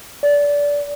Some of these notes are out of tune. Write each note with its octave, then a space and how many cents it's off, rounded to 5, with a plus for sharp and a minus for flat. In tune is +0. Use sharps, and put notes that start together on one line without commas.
D5 -20